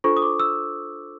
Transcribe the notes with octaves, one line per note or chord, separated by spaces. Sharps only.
D4 F4 A4 C5 C#6
D#6
D6
E6